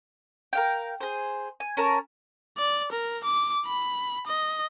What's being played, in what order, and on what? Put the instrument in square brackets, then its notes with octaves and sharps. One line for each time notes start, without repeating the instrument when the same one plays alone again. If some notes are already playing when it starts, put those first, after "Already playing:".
[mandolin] A#4 F5 G5
G#4 C5
G#5
C#4 A#4 A5
[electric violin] D5
A#4
D6
B5
D#5